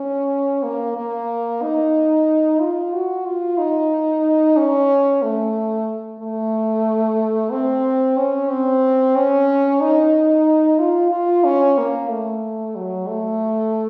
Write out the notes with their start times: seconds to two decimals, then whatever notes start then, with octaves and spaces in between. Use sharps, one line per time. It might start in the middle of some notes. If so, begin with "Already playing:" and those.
Already playing: C#4
0.63 A#3
0.97 A#3
1.62 D#4
2.61 F4
2.93 F#4
3.26 F4
3.58 D#4
4.57 C#4
5.23 A3
6.20 A3
7.52 C4
8.18 C#4
8.50 C4
9.16 C#4
9.81 D#4
10.79 F4
11.11 F4
11.44 C#4
11.78 A#3
12.10 A3
12.76 F#3
13.08 A3